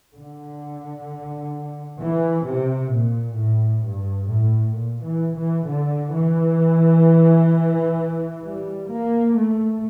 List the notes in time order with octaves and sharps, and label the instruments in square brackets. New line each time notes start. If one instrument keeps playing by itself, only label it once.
[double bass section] D3
E3
C3
A#2
A2
G2
A2
A#2
E3
E3
D3
E3
G3
A#3
A3